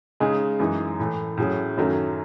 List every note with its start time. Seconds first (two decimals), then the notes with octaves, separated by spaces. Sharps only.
0.20 C#3 G#3 D#4 G#4
0.60 F#2 E3 G#3 D#4
1.00 A2 E3 A3
1.38 A2 F#3 C#4 G#4
1.78 F#2 D#3 F#3 A3 C#4